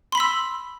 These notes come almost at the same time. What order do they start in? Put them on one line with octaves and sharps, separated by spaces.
C6 B5 B6 E6